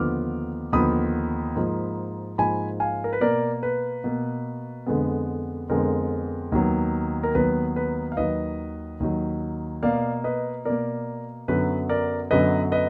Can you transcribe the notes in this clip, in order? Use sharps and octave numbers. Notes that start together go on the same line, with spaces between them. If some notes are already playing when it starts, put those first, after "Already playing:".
Already playing: D#2 D3 F3 B3 D6 F6
D#2 D3 F3 B3 B5 D#6
G#2 F3 A#3
G#2 F3 A#3 G#5 B5
F5 G#5
A#4
B4
B2 A#3 A#4 D5
B4
B2 A#3
F2 D3 G#3 B3
F2 D3 G#3 B3 A#4
D#2 D#3 F#3 B3
A#4
D#2 D#3 F#3 B3 B4
B4
F5
D#2 D#3 F#3 B4 D#5
D#2 D#3 F#3
B2 A#3 D5 F5
B4 D#5
B2 A#3 A#4 D5
F#2 D3 F#3 B3 B4
A#4 D5
F#2 D3 F#3 B3 B4 D#5
B4 D#5